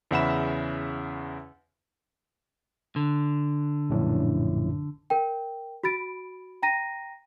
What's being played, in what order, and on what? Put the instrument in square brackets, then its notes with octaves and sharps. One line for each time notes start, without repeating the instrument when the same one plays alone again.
[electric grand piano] E2 C#3 E5 F#5 B5 E7
[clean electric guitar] D3
[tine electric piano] A#1 F#2 A2
[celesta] A#4 G5
F#4 B5 A6 D7
G5 A#5 A#6 D#7